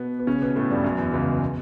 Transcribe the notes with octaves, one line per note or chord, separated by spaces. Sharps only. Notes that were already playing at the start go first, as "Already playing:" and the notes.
Already playing: B2 B3
B3
C#3 C#4
B2 B3
A2 A3
G2 G3
F#2 F#3
E2 E3
C#2 C#3
B2